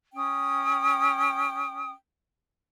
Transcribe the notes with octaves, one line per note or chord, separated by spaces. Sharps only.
C#4 G5 D#6